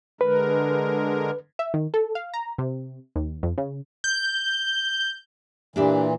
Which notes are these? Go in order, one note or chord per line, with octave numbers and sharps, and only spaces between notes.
D3 G#3 A#4 B4
E5
D#3
A4
F5
A#5
C3
D#2
F2
C#3
G6
A#2 E3 D4 G4 E5